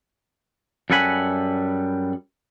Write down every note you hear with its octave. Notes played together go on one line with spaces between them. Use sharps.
F#2 G3 A4 F#5 G#5 B5